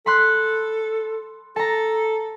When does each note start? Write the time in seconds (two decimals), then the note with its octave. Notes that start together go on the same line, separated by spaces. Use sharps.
0.06 A4 B5 C6 F#6
1.56 A4 A5 A#5